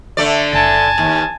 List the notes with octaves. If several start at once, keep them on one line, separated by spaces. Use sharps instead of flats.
D3 A3 D5
F#1 G#5 A5
D#2